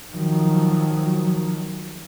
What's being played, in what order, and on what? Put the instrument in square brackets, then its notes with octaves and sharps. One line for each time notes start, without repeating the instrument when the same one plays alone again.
[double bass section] D#3 F3 F#3